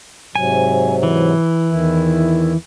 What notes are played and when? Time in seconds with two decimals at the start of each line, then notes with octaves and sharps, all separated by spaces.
0.36 G#2 C3 F#3 G#5
1.03 E3
1.70 E2 D#3 E4